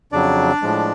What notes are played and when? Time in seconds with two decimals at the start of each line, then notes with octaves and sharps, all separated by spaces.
0.12 F2 C#3 F#3 D4 D5
0.62 A2 F3 G#3